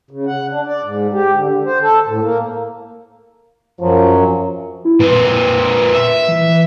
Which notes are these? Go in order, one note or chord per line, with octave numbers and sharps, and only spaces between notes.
C#3
F#5
D4
D5
G#2
G4
D3
D3
C5
A4
A2
A#3
F#2 F3 F#3
E4
A#2 C4 B4
E5
E3